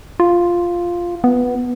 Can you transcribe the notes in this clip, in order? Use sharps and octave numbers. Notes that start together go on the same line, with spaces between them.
F4
B3